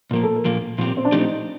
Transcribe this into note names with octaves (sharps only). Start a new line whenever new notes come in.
A#2 F3 A#3 A#4
A4
A#4
A#2 F3 A#3
A#2 F3 A3 C4 G4
C4
D4
A#2 F3 A3 C4 D#4 G4